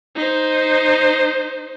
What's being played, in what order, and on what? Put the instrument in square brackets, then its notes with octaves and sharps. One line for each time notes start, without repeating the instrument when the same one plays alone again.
[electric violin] D#4 C5